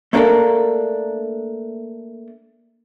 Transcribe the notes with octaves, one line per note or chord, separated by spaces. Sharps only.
A3 A#3 D4 F#4 A4 A#4